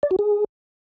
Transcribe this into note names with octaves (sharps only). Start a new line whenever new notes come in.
D5
F#4
G#4